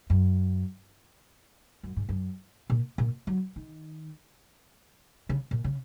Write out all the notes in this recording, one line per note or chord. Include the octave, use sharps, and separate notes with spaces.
F#2
F#2
G#2
F#2
A#2
A#2
F#3
D#3
C#3
A#2
C#3